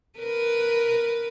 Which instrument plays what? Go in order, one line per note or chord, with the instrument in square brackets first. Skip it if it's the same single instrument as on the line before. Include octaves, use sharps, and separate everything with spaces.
[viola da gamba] A#4 B4